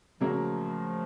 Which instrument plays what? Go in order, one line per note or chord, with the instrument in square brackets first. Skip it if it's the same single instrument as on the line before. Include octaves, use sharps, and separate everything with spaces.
[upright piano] C#3 F#3 A#3 [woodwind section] F3 A3